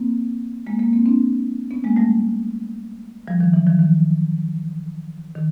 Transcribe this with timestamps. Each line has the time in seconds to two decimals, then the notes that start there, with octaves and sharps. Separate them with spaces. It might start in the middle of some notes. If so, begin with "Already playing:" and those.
Already playing: A#3 C4
0.67 G#3 A#3
0.79 G#3 A#3
0.93 A#3 C4
1.06 C4 D4
1.71 B3 C#4
1.84 G#3 A#3
1.96 G3 A3
3.28 F3 G3
3.40 D#3 F3
3.53 E3 F#3
3.67 D#3 F3
3.79 D#3 F3
5.35 D#3